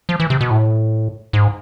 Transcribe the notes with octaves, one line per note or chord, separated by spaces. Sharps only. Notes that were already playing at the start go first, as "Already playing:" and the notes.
F3
E3
C3
B2
A2
G#2